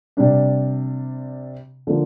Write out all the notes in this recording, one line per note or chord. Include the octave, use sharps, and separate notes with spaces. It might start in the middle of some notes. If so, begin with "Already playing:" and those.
C3 G3 D4
D3 F3 A#3